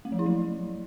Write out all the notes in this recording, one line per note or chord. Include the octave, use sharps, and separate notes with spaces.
A3
F3
E4
F#3